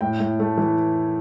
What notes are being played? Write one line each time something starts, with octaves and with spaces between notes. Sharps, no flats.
A2 G5
A2
A3
E3